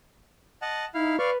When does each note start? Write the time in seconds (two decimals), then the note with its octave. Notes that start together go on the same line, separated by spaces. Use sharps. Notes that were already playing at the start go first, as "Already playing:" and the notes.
0.62 D#5 F#5 A5
0.94 D#4 E4 F5
1.19 B4 D5 F5 C#6